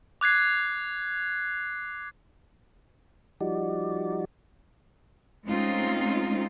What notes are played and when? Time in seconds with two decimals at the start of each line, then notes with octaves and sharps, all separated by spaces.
0.21 D6 F#6 G#6 C7
3.40 F3 G3 D#4 F#4 D5
5.46 G#3 A3 C4 C#4 D#4 F4